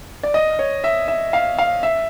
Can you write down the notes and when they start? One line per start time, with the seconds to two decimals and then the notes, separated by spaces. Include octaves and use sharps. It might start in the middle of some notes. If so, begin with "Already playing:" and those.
0.23 D5
0.34 D#5
0.59 C#5
0.84 E5
1.08 E5
1.33 F5
1.58 F5
1.83 E5